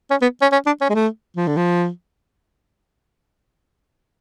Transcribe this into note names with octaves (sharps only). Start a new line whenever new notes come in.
C#4
B3
C#4
C#4
D4
C#4
G#3
A3
F3
D3
F3